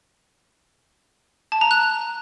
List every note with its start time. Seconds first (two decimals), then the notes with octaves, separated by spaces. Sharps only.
1.52 A5
1.61 A#5
1.71 F#6